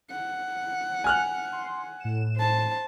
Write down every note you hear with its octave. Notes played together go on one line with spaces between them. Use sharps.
F#5
G#5 F6 F#6
C6
A2 E7
C5 A5